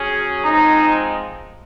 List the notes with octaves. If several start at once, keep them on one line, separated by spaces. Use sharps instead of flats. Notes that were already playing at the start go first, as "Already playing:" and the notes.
Already playing: F#3 C#4 G#4
F3 G#3 C4 D#4